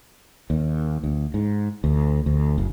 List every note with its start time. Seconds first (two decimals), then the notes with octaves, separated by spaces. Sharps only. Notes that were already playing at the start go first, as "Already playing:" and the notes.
0.50 D#2
1.04 D2
1.34 G#2
1.84 D2
2.26 D2
2.58 F#1